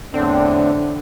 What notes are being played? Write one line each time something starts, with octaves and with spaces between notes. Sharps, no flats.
E2 A2 D3 C4 D4